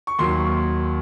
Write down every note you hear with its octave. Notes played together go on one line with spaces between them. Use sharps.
C#6
D#2 D#3 F#3 C6